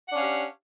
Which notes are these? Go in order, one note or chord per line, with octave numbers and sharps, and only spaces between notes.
C#4 D4 G4 F5 F#5